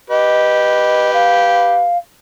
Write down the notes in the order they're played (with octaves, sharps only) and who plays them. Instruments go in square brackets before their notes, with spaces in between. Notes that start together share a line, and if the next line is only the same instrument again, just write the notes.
[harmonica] G4 B4 [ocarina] D#5
[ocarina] F5